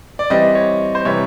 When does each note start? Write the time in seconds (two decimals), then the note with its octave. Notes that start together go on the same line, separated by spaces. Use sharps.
0.19 D5
0.30 E3 G3 C4 D#5
0.55 C#5
0.95 C5
1.05 C3 E3 G3 C#5